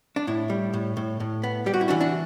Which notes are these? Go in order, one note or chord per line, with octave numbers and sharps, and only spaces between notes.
D4
A2 E4
G3
A2
A2
A2
B3
G3 G4
F#4
E4
E3 D4 F#4
D4 F#4